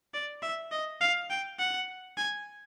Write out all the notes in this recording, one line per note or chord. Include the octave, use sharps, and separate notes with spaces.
D5
E5
D#5
F5
G5
F#5
G#5